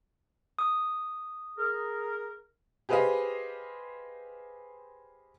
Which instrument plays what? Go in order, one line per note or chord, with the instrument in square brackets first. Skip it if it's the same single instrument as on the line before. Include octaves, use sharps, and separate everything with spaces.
[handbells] D#6
[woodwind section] G#4 A#4
[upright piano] G4 G#4 B4 C5 D#5 F5